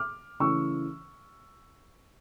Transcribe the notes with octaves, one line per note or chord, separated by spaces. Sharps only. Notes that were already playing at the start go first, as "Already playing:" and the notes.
Already playing: D6 F6
C#3 E3 A3 C#4 C#6 E6